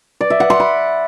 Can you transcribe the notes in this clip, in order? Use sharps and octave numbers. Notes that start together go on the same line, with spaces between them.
D5
E5
F#5
C6
B5